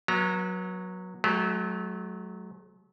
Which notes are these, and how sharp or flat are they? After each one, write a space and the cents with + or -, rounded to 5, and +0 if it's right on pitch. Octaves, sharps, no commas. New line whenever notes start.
F#3 -10 B3 -40 A#5 +0
F#3 +0 A3 -40 G4 +25